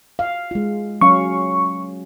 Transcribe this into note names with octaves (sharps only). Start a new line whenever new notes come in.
F5
G#3 F4
F#3 C#4 F5 C#6